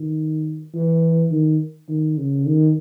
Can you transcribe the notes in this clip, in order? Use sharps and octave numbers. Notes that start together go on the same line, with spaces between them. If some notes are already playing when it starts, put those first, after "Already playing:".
Already playing: D#3
E3
D#3
D#3
C#3
D#3